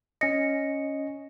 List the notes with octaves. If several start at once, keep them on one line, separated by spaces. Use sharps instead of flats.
C#4 D#5 A#6 C#7